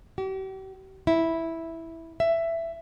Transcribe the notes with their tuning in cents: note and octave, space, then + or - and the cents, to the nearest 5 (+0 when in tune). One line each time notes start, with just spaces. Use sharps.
G4 -45
E4 -5
E5 +10